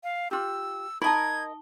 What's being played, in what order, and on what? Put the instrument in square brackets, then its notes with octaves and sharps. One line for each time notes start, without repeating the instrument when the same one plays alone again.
[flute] F5
[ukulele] F4 G4 [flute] E6
[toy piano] D#4 A5 [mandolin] A#4 D#5 [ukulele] B5 [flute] G#6